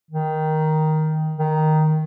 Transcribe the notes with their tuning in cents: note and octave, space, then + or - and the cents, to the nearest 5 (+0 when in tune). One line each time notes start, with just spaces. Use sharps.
D#3 +5
D#3 +0